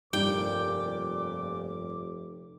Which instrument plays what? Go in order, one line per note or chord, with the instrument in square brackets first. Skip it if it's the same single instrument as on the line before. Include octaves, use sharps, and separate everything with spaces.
[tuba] F1 [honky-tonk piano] G2 [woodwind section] A#2 D6 [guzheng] G5